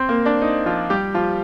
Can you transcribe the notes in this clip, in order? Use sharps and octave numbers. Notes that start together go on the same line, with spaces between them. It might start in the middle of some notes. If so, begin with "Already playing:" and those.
Already playing: C4 C5
A#3 A#4
D4
D#4
F3 F4
G3 G4
F3 F4